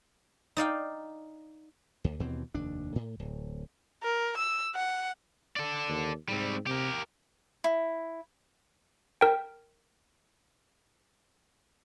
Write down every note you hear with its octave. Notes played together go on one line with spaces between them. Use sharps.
D#4 D5 F5 G5
D2
D#2 B2 E3 C4
F1 D#2 D4
A2
D1
A#4
E6
F#5
A4 D5
D#2
G#2 G3 C4
C3 G4 A#4
E4
A#4 G5